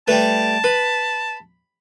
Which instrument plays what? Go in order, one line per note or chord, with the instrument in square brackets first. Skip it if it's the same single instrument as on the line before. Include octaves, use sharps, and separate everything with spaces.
[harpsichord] G3 A3 [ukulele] B4 [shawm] A5
[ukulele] B4 [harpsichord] B5